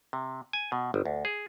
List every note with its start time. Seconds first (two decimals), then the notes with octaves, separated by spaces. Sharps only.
0.13 C3
0.53 G#5
0.72 B2
0.94 G1
1.06 D2
1.25 G#4